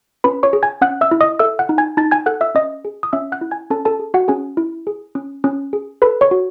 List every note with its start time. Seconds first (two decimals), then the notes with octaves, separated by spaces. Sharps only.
0.24 C#4 B4 B5
0.43 C#5 C#6
0.53 G#4
0.63 G#5 G#6
0.81 C#4 F#5 F#6
1.01 E5 E6
1.11 E4
1.21 D#5 D#6
1.39 A4 E5 E6
1.59 F#5 F#6
1.69 D#4
1.78 G#5 G#6
1.97 D#4 A5 A6
2.11 G#5 G#6
2.26 A4 F#5 F#6
2.41 E5 E6
2.55 C#4 D#5 D#6
2.85 G#4
3.03 D#6
3.13 C#4 E5 E6
3.32 F#5 F#6
3.41 E4
3.51 G#5 G#6
3.70 C#4 A4 A5
3.85 A4 A5
4.00 G#4
4.14 F#4 F#5
4.28 C#4 G#4 G#5
4.57 E4
4.87 G#4
5.15 C#4
5.44 C#4
5.73 G#4
6.02 A4 B4 B5
6.21 C#5 C#6
6.31 F#4